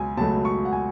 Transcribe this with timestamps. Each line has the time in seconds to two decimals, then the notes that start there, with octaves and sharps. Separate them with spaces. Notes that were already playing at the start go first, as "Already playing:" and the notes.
Already playing: C#2 B2 F#3 G#5
0.17 C#2 B2 F#3 A3 A5
0.45 C#6
0.65 F#5
0.73 G#5